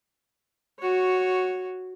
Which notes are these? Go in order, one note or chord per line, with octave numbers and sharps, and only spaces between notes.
F#4 C#5